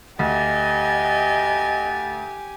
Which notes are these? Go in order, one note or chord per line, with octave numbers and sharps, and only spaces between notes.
D2 G4 D#5 G#5 A6